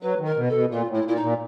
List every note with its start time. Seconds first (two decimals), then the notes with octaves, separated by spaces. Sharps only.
0.02 F#3 B4
0.20 D#3
0.25 A#4
0.37 B2
0.49 A4
0.54 B2
0.70 A#2 F4
0.88 A2
0.94 E4
1.05 A#2 E4
1.16 D#4
1.22 A#2